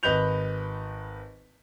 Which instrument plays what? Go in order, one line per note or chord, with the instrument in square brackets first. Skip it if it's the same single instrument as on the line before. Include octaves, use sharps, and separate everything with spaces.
[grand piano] G#1 B4 D#5 B5 G6 F7